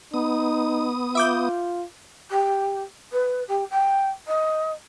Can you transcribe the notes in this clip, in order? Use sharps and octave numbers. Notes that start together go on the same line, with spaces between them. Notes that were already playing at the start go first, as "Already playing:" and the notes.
B3 D#4 D#6
F4 E5 D6 G6
G4
B4
G4
G5
D#5